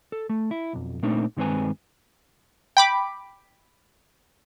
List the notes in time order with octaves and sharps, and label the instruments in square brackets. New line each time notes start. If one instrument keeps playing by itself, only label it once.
[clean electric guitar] A4
A3
E4
B1 F2
A#2 A3 A#3 C4 D4 D#4
G2 D#3 G#3 C4 B4 G#5
[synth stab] G5 B5 D6